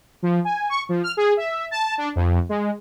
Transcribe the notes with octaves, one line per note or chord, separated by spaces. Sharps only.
F3
G#5
C#6
F3
F6
G#4
E5
A5
D4
F2
G#3